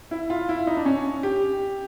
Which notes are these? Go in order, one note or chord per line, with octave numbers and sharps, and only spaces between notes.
E4
F4
E4
D#4
D4
C#4
G4